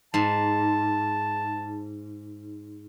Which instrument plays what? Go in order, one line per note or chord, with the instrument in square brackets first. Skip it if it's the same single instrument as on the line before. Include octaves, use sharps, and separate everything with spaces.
[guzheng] G#2 [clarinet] A5